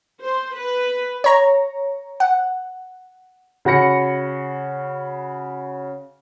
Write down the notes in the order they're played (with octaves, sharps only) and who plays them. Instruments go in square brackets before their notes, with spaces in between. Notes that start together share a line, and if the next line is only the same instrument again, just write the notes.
[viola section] C5
B4
[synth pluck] C#5 A#5
F#5
[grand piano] C#3 F#4 B5 A#6 C#7